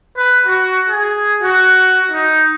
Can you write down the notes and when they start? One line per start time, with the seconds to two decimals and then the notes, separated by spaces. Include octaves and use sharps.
0.16 B4
0.46 F#4
0.90 G#4
1.43 F#4
2.12 D#4